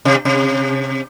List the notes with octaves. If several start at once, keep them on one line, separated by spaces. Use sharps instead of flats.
C3
C3